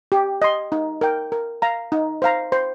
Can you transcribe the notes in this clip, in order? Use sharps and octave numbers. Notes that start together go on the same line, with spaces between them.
G4
D#5 C6
D#4
A#4 G5
A#4
F5 A#5
D#4
C5 F5 A#5
C5